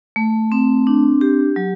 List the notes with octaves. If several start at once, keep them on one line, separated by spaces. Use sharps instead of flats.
A3
C4
D4
G4
F#3